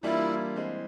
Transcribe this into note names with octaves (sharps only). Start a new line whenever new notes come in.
E3 G3 A#3 D4 E4 F4
E3 G#3 C4